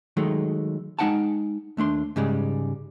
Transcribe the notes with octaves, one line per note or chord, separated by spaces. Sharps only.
D#3 F#3 G#3 A3
G#3 C#4 D#4 F#5 G5 A5
D#2 A3 D4 C6
G#2 C#3 G3 G#3